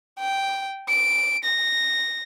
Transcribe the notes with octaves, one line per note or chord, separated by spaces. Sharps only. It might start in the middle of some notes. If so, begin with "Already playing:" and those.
G5
D7
A#6